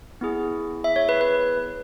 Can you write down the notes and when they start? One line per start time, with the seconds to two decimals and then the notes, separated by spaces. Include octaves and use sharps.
0.21 B3 E4 G#4
0.84 E5
0.96 C#5
1.09 B4
1.21 B4